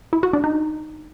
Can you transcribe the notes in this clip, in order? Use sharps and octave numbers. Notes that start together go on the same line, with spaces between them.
E4
F#4
D4
D#4